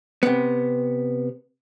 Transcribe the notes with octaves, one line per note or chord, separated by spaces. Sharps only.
C3 B3